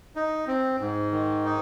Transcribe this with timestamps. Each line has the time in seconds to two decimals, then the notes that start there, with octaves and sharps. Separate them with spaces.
0.16 D#4
0.47 C4
0.80 G#2
1.12 D#3
1.45 D#4